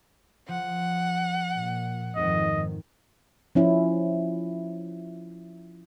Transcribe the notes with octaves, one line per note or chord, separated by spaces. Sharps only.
F3 F#5
A#2
F2 G#2 D#3 D#5
F3 C#4 E4